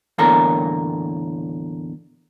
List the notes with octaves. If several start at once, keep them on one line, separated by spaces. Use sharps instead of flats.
E2 A2 D3 A#3 A4 A#4